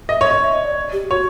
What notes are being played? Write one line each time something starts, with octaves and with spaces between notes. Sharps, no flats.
D#5 E5
C#5
D#5
C#5
E5
D#5
D5
G4
F#4 C#5